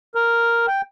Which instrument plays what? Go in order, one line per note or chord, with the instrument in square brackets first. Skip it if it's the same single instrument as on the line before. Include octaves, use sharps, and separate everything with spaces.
[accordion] A#4
G5